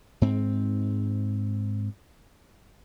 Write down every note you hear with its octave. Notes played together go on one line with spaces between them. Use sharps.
G#2 C4